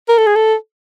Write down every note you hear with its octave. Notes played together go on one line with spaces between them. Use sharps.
A#4
A4
G#4
A4